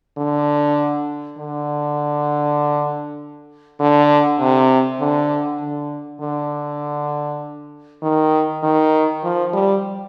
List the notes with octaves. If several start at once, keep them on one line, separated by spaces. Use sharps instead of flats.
D3
D3
D3
C3
D3
D3
D3
D#3
D#3
F3
G3